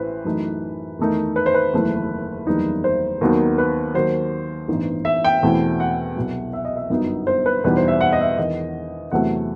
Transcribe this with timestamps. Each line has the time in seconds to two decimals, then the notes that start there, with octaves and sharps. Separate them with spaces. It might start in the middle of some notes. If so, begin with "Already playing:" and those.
Already playing: A1 A2 E3 B4 C5
0.25 F#2 E3 A3 D#4
0.99 E2 D#3 A3 D#4
1.36 B4
1.46 C5
1.54 B4
1.73 F#1 E2 D#3 A3 E4
2.47 F#1 E2 D#3 G3 D#4
2.84 C5
3.21 D#2 D#3 F#3 B3 D#4
3.58 B4
3.94 D#2 D#3 F#3 C5
4.68 A1 G2 E3 B3 D#4
5.05 E5
5.24 G5
5.42 E2 B2 A3 C4 E4
5.80 F#5
6.16 C2 B2 F#3
6.53 E5
6.65 D#5
6.77 E5
6.90 G1 F#2 F#3 B3 D#4
7.27 C5
7.46 B4
7.64 E2 B2 G3 D#4 B4
7.77 C5
7.88 E5
8.01 F#5
8.12 D#5
8.20 E5
8.38 E1 E2 D#3 D#5
9.11 E2 C3 F#3 A3 F#5